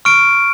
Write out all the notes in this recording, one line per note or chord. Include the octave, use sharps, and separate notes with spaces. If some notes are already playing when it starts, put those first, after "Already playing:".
C#6 F6 D7